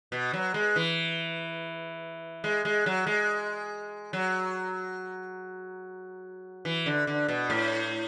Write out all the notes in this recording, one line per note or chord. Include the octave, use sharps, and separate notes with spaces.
B2
F#3
G#3
E3
G#3
G#3
F#3
G#3
F#3
E3
D3
D3
B2
A2